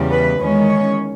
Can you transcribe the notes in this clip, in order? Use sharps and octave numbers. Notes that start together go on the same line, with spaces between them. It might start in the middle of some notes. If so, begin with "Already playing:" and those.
Already playing: E2 C#3 G3
B4
E2 D#3 G#3 C#4
C#5